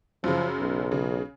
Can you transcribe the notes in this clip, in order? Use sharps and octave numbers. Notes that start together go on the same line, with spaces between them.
F#2 C#3 F3
B1
C#3